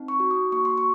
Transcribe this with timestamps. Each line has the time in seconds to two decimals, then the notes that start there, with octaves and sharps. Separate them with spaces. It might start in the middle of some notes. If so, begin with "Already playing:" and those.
Already playing: C4 D#4
0.08 C#6
0.20 F#4
0.31 D#6
0.52 A#3 C#6
0.65 C6
0.78 C#6